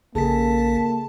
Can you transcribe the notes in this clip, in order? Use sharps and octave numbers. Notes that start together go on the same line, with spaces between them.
A#1 C#3 A#3 G#4 A4 A5 B6